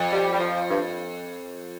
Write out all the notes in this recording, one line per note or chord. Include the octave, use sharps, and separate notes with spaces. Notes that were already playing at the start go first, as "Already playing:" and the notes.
Already playing: F2
G3
G3
F3
G2